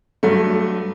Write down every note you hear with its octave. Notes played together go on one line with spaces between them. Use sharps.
G2 F#3 A3